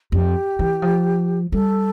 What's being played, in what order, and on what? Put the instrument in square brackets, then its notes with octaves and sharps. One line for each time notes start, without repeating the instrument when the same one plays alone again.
[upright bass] F2 [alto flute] G4
[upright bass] E3
F3
[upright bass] G3 [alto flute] A4